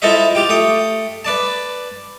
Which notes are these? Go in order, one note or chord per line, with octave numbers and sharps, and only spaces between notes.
E4 F4 A4 C5 D#5 E5
F4 G4 G5
A3 G5 D#6
B4 D5 A5